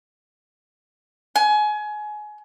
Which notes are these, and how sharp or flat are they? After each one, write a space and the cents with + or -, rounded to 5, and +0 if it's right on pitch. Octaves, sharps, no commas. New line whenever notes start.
G#5 +25